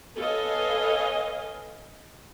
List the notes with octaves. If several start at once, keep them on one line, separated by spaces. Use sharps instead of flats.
A4 B4 C#5 D#5 F5 G#5